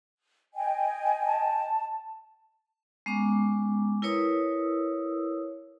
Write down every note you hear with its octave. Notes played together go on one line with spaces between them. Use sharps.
D#5 G5 G#5
A5
G#3 B3 C#4 A#5 D6
E4 A#4 B4 C#5 D#6 E6